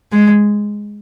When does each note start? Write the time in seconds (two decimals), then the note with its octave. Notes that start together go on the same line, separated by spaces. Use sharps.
0.12 G#3